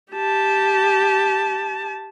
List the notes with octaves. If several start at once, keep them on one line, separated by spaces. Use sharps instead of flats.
G4 A5